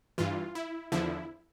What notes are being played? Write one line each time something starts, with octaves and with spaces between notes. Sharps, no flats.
G2 E3 F4
E4
E2 D3 F3 E4